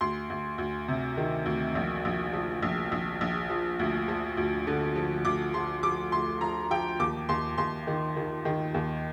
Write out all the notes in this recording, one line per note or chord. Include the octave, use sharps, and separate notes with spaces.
D2 C6
D2
D2
C3
D#3
D2
A#1
A#1
F3
A#1
A#1
A#1
F3
D2
F3
D2
D3
F3
D2 D6
F3 C6
F3 D6
D2 C6
F3 A#5
F3 G5
D#2 D6
D#2 C6
D#2 C6
D#3
D#3
D#3
D#2